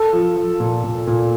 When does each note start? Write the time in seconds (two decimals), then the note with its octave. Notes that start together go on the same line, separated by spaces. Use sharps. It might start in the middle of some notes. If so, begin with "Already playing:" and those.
Already playing: A4
0.13 F3
0.36 F3
0.60 A#2
0.84 A#2
1.07 A#2